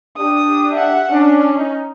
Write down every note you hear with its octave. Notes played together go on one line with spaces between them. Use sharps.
D4 G4 D#6
E5 F#5
C#4 D4
D#4